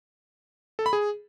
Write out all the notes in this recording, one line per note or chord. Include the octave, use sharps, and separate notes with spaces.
A4
B5
G#4